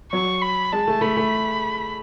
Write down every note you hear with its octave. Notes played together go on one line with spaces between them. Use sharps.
F#3 C#6
B5
G#3 A5
A3
A3 B5
A3